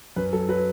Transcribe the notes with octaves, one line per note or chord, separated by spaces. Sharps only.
F#2 B4
F#3 A4
F#3 B4